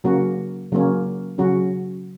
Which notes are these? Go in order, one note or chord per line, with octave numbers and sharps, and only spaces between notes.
C#3 F#3 A#3 C#4 F#4
C#3 F#3 A#3 C#4
C#3 F#3 C#4 F#4